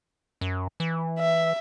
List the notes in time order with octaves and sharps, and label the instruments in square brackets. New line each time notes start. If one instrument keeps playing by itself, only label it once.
[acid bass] F#2
E3
[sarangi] E5